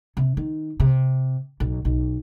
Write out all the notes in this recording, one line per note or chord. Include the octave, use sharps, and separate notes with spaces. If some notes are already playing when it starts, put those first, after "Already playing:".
C3
D#3
C3
B1
B1